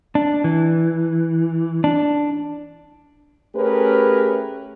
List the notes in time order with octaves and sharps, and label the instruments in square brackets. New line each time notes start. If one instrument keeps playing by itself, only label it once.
[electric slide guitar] D4
E3
D4
[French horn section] A3 C#4 G4 G#4 A#4 B4